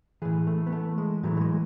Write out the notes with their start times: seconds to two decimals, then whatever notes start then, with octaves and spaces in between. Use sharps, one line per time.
0.22 A2 E3 G#4
0.47 A3
0.67 B3
0.72 A3
0.98 G#3
1.23 A2 E3 F#3
1.37 A3
1.41 G#3